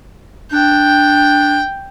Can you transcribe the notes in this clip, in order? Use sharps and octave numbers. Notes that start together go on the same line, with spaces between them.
D4 G5